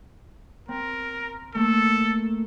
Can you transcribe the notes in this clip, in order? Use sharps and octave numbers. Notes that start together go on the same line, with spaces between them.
C4 A#4
A3 A#3 A4